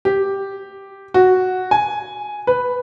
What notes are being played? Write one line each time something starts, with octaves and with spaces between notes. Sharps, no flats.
G4
F#4
G#5
B4